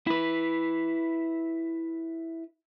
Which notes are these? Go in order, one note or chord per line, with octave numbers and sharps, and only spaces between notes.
E4 B4